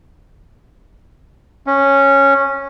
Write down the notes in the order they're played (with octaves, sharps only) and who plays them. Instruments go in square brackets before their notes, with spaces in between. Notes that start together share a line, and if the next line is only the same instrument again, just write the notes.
[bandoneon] C#4